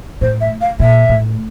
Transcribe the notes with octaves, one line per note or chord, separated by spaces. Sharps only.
A2 C5
E5
F5
A#2 E5
A2